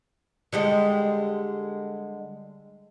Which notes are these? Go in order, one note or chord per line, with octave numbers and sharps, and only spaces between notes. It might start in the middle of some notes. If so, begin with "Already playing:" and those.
D3 G3 G#3